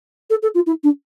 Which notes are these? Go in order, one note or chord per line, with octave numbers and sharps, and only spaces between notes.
A4
A4
F4
E4
D4